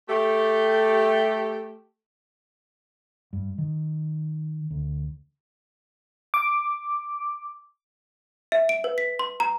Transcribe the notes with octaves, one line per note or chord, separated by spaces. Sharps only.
A3 G4
G2
D#3
D2
D6
E5
D7
B4
B6
C6
A#5